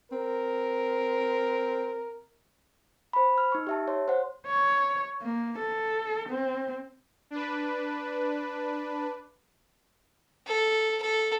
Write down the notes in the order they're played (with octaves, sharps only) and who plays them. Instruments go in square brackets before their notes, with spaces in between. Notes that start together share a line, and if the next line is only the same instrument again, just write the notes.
[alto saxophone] C4 [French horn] A#4
[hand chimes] C5 B5
F6
D#4 C#6
G4 E5 A5
C#5 C6
C5 F#5
[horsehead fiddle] C#5
A#3
A4
C4
[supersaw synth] D4 B4
[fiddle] A4
A4